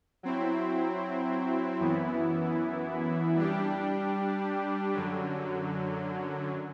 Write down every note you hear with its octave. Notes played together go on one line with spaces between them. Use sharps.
F#3 C4 E4
F#2 E3 B3 E4
G3 D4 G4
F#2 D3 F#3